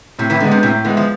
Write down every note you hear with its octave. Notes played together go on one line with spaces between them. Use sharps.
A2 C3
C3 E3
D3 G#3 B3
C3
A2 C3
E3 G#3 B3
F3